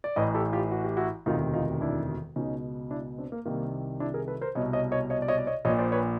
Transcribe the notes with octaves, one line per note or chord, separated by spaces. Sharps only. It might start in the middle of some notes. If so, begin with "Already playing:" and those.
D5
A1 A2 E3 C#5 D#5
G4 A4
F4 G4
F#4
G4
E4 F#4
E1 D2 C3 D#3 D#4 F4
D#4 F4
D4 E4
C#2 B2 C#4 D#4
D4 E4
C4 D4
A#3
C2 C3 D#3 A#3
D4 E4
G#4 A#4
A4 B4
A#4 C5
C2 B2 C#5 D#5
C#5 D#5
C#5 D#5
C#5 D#5
D5
C#5 D#5
D5
C#5 D#5
A#1 A#2 C#5 D#5
C5 D5
B4 C#5